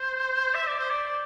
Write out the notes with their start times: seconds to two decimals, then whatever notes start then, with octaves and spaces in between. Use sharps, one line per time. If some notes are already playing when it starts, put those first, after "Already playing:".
Already playing: C5
0.54 E5
0.67 D5
0.79 C5
0.90 D5